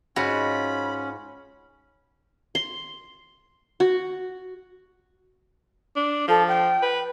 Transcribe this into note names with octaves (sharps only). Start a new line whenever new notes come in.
G#2 C#4 F4 F#4 B5
C6
F#4
D4
F3 A4
G5
B4